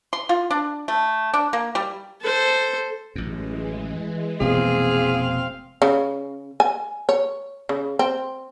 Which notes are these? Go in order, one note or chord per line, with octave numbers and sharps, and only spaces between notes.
C6
F4
D4
A3
D4
A#3
G3
A4 C5
A1 F#2 E3 G#3
F1 B2 A#3 C4 G#4 F5
C#3
G#5
C#5
C#3
C4